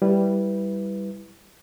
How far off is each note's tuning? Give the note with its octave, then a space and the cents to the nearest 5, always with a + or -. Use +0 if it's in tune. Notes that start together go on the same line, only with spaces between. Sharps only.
G3 +0 E4 +0 B4 +0